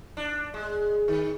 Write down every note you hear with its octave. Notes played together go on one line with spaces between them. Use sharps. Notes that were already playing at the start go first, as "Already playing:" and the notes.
D4
G#3
D#3